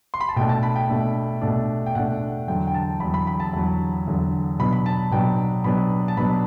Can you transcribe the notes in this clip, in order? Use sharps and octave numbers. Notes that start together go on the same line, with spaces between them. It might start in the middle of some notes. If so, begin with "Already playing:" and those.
C6
B5
A5
B2 A3 D4 G5
A5
B5
G5
B2 A3 D4
B2 A3 D4
G5
B2 A3 D4 F#5
E2 D3 F#3 G5
G5
A5
E2 D3 F#3 B5
B5
B5
A5
E2 D3 F#3
E2 D3 F#3
B2 F#3 B3 D4 B5
B5
A5
B2 F#3 B3 D4 G5
B2 F#3 B3 D4 B5
A5
B2 F#3 B3 D4 B5